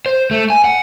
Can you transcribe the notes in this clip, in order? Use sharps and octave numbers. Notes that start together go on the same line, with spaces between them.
C5
A3
G#5
F#5